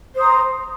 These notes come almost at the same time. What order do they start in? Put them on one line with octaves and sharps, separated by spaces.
C5 D#6 A#5